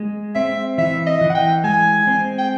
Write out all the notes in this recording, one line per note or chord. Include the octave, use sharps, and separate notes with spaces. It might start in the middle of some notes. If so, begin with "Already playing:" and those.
Already playing: G#3
C4 E5
E3 E5
D#5
E3
F#5
G5
G#3 G#5
C4
G5